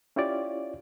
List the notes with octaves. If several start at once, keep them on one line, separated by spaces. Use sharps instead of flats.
C#4 E4 F4 G4 C#5 D5